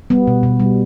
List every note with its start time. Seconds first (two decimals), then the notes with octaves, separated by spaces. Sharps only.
0.10 G3 B3
0.27 B2
0.43 B2
0.60 G3